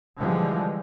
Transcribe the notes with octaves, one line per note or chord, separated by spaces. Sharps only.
D3 E3 F3 G3 G#3